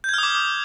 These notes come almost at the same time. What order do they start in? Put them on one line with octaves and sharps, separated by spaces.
G6 G#6 F6 D#6 D6